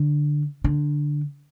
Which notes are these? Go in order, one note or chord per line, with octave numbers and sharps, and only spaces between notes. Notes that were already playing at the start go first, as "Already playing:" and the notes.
Already playing: D3
D3